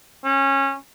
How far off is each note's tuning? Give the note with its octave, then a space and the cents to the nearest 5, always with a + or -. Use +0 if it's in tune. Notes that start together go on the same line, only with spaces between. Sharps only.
C#4 -20